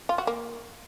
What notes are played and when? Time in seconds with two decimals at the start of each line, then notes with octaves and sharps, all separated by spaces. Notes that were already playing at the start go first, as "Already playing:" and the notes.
0.09 F4
0.18 F#4
0.27 A#3